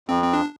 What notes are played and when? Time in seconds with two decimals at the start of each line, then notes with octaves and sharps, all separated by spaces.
0.08 F2 C4
0.23 C4
0.33 D4